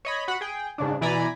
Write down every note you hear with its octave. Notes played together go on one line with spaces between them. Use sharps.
C#5 D#5 B5
F#4 F#5 B5
G#4 G5
G#2 C#3 D4
B2 E3 D5 G#5 A#5 B5